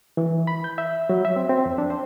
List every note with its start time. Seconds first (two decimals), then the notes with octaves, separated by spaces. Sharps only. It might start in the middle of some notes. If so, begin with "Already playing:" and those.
0.17 E3
0.47 B5
0.64 G6
0.78 E5
1.10 F#3
1.25 E5
1.36 C4
1.49 C4
1.66 F2
1.78 D4
1.90 C5